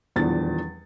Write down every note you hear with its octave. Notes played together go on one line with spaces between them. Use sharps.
D#1 E2 F3 D4 A6